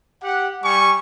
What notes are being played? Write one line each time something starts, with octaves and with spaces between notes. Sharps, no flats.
G4 F#5
G3 G#5 C#6